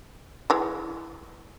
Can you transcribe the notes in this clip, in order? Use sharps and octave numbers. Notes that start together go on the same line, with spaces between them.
E3 G#3